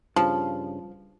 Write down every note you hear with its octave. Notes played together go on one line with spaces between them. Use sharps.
G2 C#3 F3